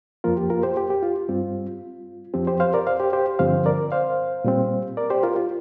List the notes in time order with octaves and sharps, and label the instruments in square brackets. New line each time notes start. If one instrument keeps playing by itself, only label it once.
[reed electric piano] F2 F3 A#3 F4 A#4
G4
F4 A#4
G4 C5
G4
G4
F4
G2 G3 C4 F4
F2 F3 C4 G4
G4 C5
C5 F5
A#4 D5
C5 F5
G4 C5
G4 C5
G2 D3 F3 C4 C5 F5
A#4 D5
C5 F5
A#2 G3 C4
A#4 D5
G4 C5
F4 A#4
F4